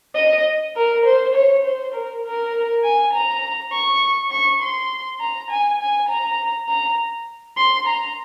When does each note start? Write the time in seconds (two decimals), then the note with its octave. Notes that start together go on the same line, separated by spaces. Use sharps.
0.15 D#5
0.75 A#4
1.04 C5
1.34 C#5
1.64 C5
1.93 A#4
2.24 A#4
2.83 G#5
3.13 A#5
3.71 C#6
4.30 C#6
4.60 C6
5.19 A#5
5.49 G#5
5.79 G#5
6.08 A#5
6.68 A#5
7.56 C6
7.86 A#5